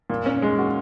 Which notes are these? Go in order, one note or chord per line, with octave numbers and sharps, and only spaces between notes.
A#2
C#4
G#3
F#4